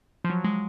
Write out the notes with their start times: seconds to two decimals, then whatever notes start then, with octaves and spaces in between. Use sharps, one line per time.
0.24 F3
0.30 F#3
0.44 G#3